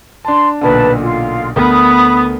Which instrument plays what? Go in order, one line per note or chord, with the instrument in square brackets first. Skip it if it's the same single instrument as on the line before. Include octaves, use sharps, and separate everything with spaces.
[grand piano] D4 A5 [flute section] C6
[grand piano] B1 A#2 D3 [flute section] B4 A5
[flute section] F4
[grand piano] D2 A3 A#4 [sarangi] B3 [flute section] B5 D#6